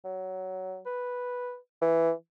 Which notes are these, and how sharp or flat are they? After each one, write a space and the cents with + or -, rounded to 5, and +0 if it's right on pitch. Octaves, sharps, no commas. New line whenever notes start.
F#3 +15
B4 -5
E3 +5